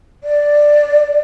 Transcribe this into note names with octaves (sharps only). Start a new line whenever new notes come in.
D5